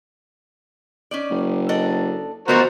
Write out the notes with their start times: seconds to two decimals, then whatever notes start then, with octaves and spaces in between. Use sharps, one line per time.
1.11 C#4 D#4 D5
1.30 F#1
1.69 D4 A4 D#5
2.48 B2 E3 F3 A3 F#4 A#4 C5